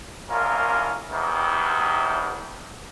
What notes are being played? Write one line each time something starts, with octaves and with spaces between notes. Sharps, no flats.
C2 A2 A#3 C#4 F4 A#4
E2 C3 D#3